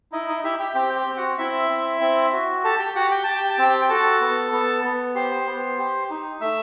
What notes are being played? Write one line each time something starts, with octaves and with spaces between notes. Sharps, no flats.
D#4 E4 D#5
D#4 D#5
E4 G4 E5
G4 G5
C4 G4 G5
G4 G5
C4
F#4 F#5
C4 E4 E5
C4
C4
F#4
G4 A4 A5
G4 G5
F#4 G4 F#5
G5
G4 A5
G5
A5
C4 G4 G5
F#4 A4 A5
B3
B3
B3
G4 C5 C6
B3
G4
D#4
A3 E5 E6